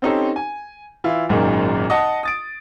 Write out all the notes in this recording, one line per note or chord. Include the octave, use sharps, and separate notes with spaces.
C4 C#4 D#4 G4 A4 C5
G#5
E3 E4 F4
G#1 F#2 A#2 D#3 G#3
D#5 F#5 A5 D#6
D#6 A6 D7